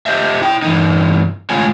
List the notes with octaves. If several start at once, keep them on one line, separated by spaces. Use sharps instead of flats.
G4 C5 D#5 E5
E4 G5
G2 E3 D#4
A2 D3 G#3 F4 C#5 G#5